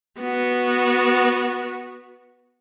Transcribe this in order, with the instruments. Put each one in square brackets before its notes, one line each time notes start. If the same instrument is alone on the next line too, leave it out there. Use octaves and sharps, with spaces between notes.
[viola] B3 F#4